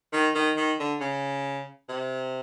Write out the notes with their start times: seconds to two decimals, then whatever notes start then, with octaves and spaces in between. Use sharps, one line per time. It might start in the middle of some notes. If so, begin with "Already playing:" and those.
0.13 D#3
0.35 D#3
0.57 D#3
0.79 D3
1.01 C#3
1.89 C3